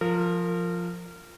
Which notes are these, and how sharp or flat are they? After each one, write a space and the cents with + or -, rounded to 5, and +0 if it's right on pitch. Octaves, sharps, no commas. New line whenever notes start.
F3 +0 A#4 -25